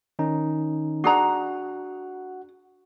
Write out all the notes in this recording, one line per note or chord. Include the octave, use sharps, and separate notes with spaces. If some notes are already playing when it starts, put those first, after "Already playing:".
D#3 C#4 D#4
D4 F#4 G#4 F#5 A#5